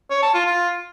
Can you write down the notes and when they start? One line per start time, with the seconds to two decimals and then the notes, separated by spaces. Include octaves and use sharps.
0.10 C#5
0.22 A5
0.34 F4
0.46 F4